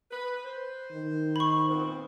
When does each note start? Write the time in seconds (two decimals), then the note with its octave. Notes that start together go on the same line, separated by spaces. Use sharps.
0.11 B4
0.44 C5
0.92 D#3
1.36 B5 C#6
1.69 A#2 B3 C4